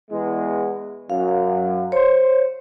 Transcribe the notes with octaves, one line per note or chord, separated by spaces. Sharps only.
E2 G#3
F#2 F5
C5 C#5